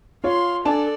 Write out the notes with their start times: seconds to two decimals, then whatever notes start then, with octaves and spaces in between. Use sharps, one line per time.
0.24 F4 C#5 F5 C6
0.65 D4 A4 D5 G#5 A5